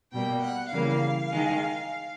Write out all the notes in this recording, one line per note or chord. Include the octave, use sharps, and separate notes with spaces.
B2 G3 A#3 G5
F#5
C#3 E3 G3 A#3 F5
D#3 G#3